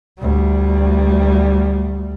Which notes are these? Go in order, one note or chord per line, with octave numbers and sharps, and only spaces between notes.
D2 G3